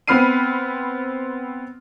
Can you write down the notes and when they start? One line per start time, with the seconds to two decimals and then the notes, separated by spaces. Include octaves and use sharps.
0.08 B3 C4 B5 F6 C7 D#7